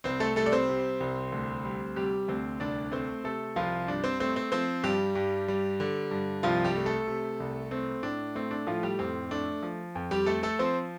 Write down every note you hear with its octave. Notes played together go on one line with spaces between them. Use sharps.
C2 C4 C5
A3 A4
G3 A3 A4
D5
C4 C5
C3
C2
D2
G3
C3 G3 G4
D2 C4 C5
C2 D4 D5
A3 C4 C5
C3 A3 A4
C2 F3 F4
G2 D4
C4 C5
A3 C4 C5
C4 C5
F3 C4 C5
G2 G3 G4
G2
G3
D3
G2
C2 F3 F4
G3 G4
A3
A3 A4
C3
C2
A3 C4
A2 D4
A3 C4
D4
A2 F3 F4
G3 G4
F2 C4
A3 D4
F3
F2
G3 G4
A3 A4
A3 A4
F3 C4 C5